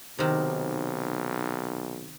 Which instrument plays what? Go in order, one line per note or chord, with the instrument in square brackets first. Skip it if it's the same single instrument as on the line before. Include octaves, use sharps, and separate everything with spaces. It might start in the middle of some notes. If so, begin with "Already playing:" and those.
[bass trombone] B1 [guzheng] C3 D#3